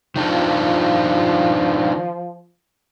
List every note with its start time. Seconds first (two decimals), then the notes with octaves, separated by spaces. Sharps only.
0.16 D#3 F3 D4 F4